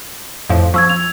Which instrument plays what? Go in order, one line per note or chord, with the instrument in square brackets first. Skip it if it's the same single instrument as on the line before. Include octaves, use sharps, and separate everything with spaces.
[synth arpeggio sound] F2 A2 F3
[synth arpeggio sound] F3 [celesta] C#6 E6 G#6
[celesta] F7